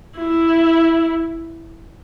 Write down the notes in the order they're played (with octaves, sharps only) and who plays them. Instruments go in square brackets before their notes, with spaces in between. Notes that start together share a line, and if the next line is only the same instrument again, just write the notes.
[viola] E4